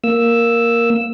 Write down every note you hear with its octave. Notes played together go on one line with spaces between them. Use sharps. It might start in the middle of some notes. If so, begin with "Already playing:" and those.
A#3 E6